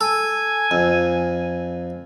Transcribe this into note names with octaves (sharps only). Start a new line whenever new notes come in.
A4 G#5
F2